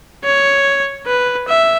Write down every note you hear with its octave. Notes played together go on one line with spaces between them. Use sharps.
C#5
B4
E5